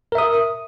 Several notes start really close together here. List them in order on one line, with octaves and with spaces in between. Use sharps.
A#4 E5 D#6